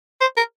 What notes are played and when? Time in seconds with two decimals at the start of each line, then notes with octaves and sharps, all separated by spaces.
0.21 C5
0.37 A#4